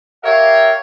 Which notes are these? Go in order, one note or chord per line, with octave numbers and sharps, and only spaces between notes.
G4 A#4 C#5 E5 F5